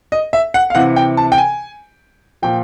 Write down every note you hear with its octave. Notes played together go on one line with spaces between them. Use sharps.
D#5
E5
F#5
F5
C3 E3 F#5
G5
A5
G5
G#5
A#2 F3 G5